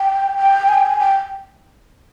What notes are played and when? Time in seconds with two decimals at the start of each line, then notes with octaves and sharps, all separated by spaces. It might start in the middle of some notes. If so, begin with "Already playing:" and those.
Already playing: G5
0.37 G5
0.68 G#5
0.74 G5
0.86 G#5
0.99 G5